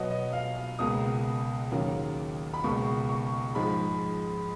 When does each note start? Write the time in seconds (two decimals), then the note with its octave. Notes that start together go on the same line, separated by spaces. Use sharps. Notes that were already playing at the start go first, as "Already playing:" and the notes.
Already playing: B2 F#3 B3 D#5
0.11 D#5
0.33 F5
0.56 F5
0.79 C#2 B2 A#3 D#6
1.71 D#2 C#3 F#3 A#3
2.54 B5
2.64 C#2 B2 A#3 C#6
3.09 C#6
3.55 G#2 F3 G#3 B5